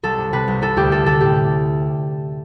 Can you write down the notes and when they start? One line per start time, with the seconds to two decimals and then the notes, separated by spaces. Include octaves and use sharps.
0.03 C2 A4
0.18 C3
0.33 C3 B4
0.47 C2
0.62 C3 A4
0.77 D2 G4
0.91 C3 A4
1.06 D2 A4
1.21 A2 G4